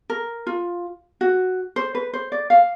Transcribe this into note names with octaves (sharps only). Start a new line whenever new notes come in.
A#4
F4
F#4
C5
B4
C5
D5
F5